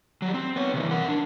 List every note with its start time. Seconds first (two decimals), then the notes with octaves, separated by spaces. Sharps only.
0.22 F#3 G3
0.34 C4
0.56 B3 C#5
0.74 C3 E3
0.91 A#4 F#5
1.08 D4